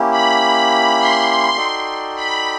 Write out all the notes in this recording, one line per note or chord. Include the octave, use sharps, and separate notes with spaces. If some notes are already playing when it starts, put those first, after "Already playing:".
Already playing: A#3 C#4 E4 G4
B5
C6
C6
D#4 F#4 A4 D5 G5
B5